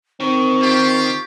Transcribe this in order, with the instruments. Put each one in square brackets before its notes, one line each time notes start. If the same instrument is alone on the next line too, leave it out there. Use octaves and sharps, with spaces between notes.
[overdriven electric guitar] D#3 [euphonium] C4 [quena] C#6
[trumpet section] F4 G4